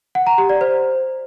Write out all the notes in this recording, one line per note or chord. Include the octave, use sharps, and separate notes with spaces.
F#5
A#5
G4
D5
C5